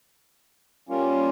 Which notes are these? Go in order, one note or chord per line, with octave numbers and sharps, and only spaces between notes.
G3 A#3 C#4 F4